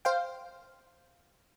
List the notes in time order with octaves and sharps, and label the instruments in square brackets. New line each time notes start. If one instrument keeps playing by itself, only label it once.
[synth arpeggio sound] C5 F5 G5